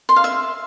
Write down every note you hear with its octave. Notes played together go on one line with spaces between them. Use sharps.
C6
F5
E5